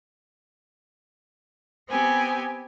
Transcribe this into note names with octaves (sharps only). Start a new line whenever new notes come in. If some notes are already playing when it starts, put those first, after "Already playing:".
B3 C4 G4 G#5